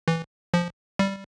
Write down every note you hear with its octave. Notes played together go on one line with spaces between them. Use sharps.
E3
F3
G3